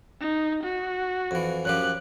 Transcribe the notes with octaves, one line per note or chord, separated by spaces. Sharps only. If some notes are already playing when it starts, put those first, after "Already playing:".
D#4
F#4
F2 E3
F#2 F3 G4 F#6